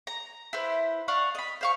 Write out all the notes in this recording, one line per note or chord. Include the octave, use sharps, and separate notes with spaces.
A#5
E4 B4 C5
D5 F5 F#5 C#6
D#5 B5
C5 F5 C#6